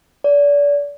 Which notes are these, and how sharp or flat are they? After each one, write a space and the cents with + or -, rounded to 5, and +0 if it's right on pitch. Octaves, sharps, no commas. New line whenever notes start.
D5 -30